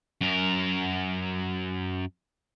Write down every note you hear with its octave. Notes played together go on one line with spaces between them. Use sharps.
F#2 A#4